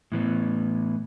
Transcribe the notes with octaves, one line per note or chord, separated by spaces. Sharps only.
A2 E3 B3